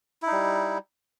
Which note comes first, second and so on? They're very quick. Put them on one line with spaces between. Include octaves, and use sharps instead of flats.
E4 D#4 G3